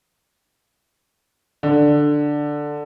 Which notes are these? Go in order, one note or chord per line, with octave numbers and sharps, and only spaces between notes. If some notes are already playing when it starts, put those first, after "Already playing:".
D3